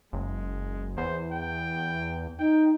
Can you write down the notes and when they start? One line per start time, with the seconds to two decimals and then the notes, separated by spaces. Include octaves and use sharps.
0.13 F#1 G#3
0.97 E2 C5
1.32 G5
2.39 D#4 G5